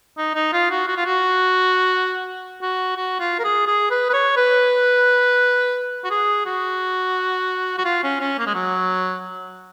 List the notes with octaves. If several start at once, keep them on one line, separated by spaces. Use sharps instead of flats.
D#4
D#4
F4
F#4
F#4
F4
F#4
F#4
F#4
F4
A#4
G#4
G#4
B4
B4
C#5
B4
F#4
G#4
F#4
F#4
F4
C#4
C#4
A#3
G#3
F#3